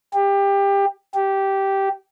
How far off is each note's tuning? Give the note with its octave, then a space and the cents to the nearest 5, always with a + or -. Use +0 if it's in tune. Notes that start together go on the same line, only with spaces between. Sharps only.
G4 +20
G4 -10